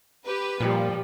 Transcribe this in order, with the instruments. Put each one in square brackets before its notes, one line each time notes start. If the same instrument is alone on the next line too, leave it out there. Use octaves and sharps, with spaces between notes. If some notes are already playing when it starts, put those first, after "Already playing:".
[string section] G4 B4
[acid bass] A#2 [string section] F3 [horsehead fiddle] G3